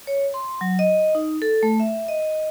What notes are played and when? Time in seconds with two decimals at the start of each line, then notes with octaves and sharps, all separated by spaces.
0.07 C#5
0.34 C6
0.61 F#3
0.79 D#5
1.15 D#4
1.42 A4
1.63 A3
1.80 E5
2.08 D#5